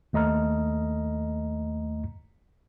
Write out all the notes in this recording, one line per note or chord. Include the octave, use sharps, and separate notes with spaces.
D#2 A3 D#5 A#5 F6